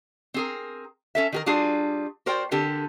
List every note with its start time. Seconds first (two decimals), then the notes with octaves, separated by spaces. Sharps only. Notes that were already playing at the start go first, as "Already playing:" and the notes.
0.34 C4 G#4 A#4
1.15 C#4 A4 E5
1.32 D#3 G4 A#4
1.46 G3 D4 F4 F#4 G#4
2.26 F#4 A#4 C5 D5 G5
2.51 D3 C4 G4 A4 A#4